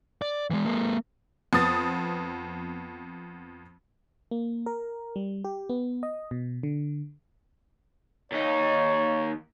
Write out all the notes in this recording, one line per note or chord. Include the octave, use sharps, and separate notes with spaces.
D5
E3 G#3
G#3 A#3
F2 B3 D#6 A6
A#3
A#4
G3
G4
B3
D#5
B2
D3
D#2 D#4 C#5